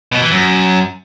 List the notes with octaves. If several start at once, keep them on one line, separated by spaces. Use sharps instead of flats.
B2
E3
F#2